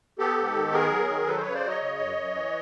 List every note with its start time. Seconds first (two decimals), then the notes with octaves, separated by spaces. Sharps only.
0.19 B3 G4 A4
0.38 G#2
0.55 D#3
0.73 B3 G#4 A#4
0.91 F#3
1.09 D#3
1.27 F#3 A4 B4
1.37 C5
1.40 B4 C#5
1.46 C#3
1.54 C5 D5
1.64 F#3 C#5 D#5
1.81 C#3
2.00 F#2
2.17 F#2
2.34 E3